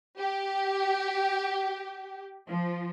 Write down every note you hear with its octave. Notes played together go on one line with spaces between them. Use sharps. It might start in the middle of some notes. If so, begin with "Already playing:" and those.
G4
F3